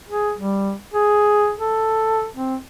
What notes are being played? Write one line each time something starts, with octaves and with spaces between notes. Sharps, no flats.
G#4
G3
G#4
A4
C4